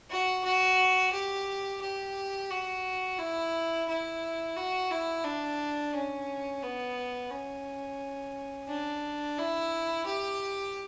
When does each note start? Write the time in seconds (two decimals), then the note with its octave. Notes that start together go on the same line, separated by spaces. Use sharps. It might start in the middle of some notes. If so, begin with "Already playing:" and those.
0.10 F#4
0.44 F#4
1.12 G4
1.81 G4
2.50 F#4
3.19 E4
3.88 E4
4.56 F#4
4.91 E4
5.25 D4
5.95 C#4
6.63 B3
7.31 C#4
8.68 D4
9.38 E4
10.06 G4